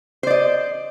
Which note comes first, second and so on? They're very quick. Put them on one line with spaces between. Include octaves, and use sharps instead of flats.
C5 D5 D#5